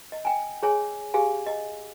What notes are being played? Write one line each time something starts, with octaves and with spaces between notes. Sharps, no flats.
D#5
G5 G#5
G#4 C#5 G#5
G4 G#4 F5 G#5
D#5